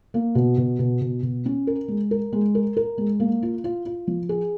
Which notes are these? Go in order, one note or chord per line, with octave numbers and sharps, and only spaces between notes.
A#3
B2
B2
B2
B2
B2
C#4
A#4
G#3
A#4
G#3
A#4
A#4
G#3
A#3
F4
F4
F4
F3
G#4